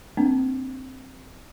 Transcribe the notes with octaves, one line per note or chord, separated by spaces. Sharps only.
A#3 C4 D4